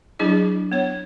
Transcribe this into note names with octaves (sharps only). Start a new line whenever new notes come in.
F#3 D4 E4 G#4 D#5
B3 C#5